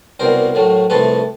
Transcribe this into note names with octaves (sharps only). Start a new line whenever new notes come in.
C2 B2 G3 A#4 C5
A2 F#3 A3
C2 C3 F3 A3 A4 B4